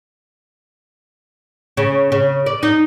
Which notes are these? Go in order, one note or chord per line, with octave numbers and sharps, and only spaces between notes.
C#3
C#3
D5
D#4